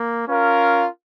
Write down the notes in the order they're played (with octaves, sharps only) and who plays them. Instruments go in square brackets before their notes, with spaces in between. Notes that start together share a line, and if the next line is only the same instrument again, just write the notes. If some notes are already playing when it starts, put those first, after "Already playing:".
Already playing: [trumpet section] A#3
C#4 F4 A#4 F5